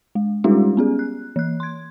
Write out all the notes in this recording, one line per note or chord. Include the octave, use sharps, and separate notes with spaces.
G#3
G3 G#3 C#4 D#4 F4 G4
B3 C#4 G#4
F#6
E3 F#6
C6 G#6